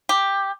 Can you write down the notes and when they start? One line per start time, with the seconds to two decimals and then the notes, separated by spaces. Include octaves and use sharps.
0.09 G4